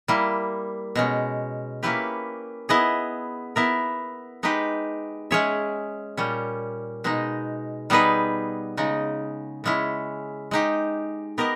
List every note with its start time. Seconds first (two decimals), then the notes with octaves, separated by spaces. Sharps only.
0.08 G3 A#3 E4
0.95 B2 G#3 C#4
1.83 A#3 C#4 E4 G4 B4
2.69 B3 E4 G#4 D#5
3.56 B3 E4 A#4 E5
4.43 G#3 D#4 G4 B4
5.31 G#3 C#4 G#4 C#5 E5
6.17 A#2 G3 C#4
7.04 B2 G#3 D#4
7.90 G3 B3 D#4 G#4 B4
8.77 C#3 G#3 D#4
9.64 C#3 G#3 C#4 E4
10.51 G#3 D#4 G4
11.38 B3 G4 A#4 D#5